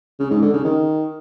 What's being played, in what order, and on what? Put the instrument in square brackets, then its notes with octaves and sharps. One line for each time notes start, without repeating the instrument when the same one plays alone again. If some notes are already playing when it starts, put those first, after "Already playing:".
[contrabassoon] C#3
G#2
D3
C#3
D#3